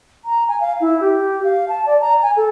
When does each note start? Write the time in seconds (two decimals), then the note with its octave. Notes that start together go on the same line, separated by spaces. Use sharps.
0.25 A#5
0.48 G#5
0.60 F5
0.81 E4
1.01 G4
1.44 F5
1.69 A5
1.86 D5
2.01 A#5
2.22 G#5
2.37 A4